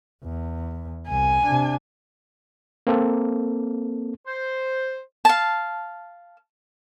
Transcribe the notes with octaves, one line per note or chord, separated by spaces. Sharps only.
E2
C2 G#5
C3 D4
A#3 C4 A4
C5
F5 A5